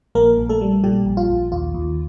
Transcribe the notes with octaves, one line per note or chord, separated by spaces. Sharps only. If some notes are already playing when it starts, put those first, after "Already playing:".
A#1 A#3 A#4
A#1
A3 A4
G3
A#2 G3 G4
A#1
F4
A#1
D#2 F4
D#2